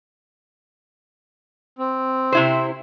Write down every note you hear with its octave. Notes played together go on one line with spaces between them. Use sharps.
C4
C3 E4 C5